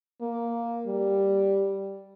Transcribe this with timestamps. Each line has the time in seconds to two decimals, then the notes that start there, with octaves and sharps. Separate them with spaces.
0.22 A#3
0.87 G3